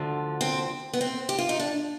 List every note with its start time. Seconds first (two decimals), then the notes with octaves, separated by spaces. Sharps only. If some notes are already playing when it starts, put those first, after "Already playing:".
Already playing: D2 D3 F3
0.41 C4
0.93 B3
1.01 C4
1.29 G4
1.39 F4
1.49 D#4
1.60 D4